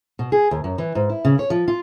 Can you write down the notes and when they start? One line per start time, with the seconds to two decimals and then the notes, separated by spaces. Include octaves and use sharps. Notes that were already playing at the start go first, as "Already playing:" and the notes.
0.19 B2
0.32 G#4
0.51 D#2
0.64 F#2
0.78 E3
0.95 G#2
1.10 E4
1.25 C#3
1.39 C#5
1.50 F3
1.68 F4